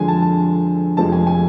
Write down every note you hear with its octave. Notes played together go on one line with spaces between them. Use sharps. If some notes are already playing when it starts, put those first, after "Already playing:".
Already playing: F2 D3 F3 G#3 G#5
A5
A5
F1 F2 F3 G#3 A5
G#5
G#5